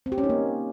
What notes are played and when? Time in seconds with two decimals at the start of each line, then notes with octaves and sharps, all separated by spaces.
0.06 C4
0.12 G4
0.18 C#4
0.24 D#4
0.29 A#3